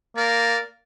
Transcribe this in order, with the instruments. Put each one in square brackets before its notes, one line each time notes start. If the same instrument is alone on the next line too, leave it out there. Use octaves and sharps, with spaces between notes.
[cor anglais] A#3 [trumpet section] A#4 D5